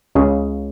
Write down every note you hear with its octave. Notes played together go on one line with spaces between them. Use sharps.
C#2 C#3 G#4